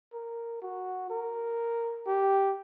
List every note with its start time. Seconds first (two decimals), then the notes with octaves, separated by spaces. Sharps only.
0.13 A#4
0.62 F#4
1.10 A#4
2.07 G4